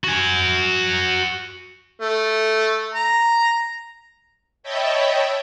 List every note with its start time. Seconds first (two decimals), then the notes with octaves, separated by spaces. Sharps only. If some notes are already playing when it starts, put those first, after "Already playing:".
0.04 F#4 G#5
2.00 A3
2.94 A#5
4.63 C#5 D#5 E5 G5 A5 B5